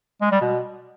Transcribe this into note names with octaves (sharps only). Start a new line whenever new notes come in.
G#3
G3
B2